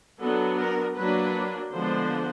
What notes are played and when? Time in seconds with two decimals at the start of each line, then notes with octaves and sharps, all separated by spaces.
0.21 F#3 B3 D4 A4
0.59 A#4
0.97 F#3 A#3 D4 B4
1.73 D3 F3 G#3 B3 D4 C5